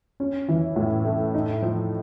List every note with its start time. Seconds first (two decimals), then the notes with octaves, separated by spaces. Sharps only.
0.20 C#4
0.48 E3
0.76 A2
1.05 A3
1.34 D#4
1.62 F3